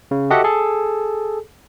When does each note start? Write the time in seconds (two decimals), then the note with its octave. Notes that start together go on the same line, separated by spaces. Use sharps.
0.11 C#3
0.30 F#4 G4 A4 D#5 E5 F#5
0.44 G#4 A4